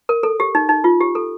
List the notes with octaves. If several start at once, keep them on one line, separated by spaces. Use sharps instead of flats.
A#4
A4
G4
D#4
D#4
F4
G4
A4